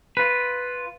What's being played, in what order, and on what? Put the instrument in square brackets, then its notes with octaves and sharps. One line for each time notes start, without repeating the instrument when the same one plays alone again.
[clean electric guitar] F4 B4